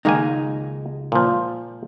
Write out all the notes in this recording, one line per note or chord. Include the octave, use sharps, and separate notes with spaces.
C#2 D#3 G#3 A#3 D#4 G#5
A#2 F3